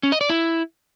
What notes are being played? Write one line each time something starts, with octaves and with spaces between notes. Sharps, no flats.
C#4
D#5
D5
E4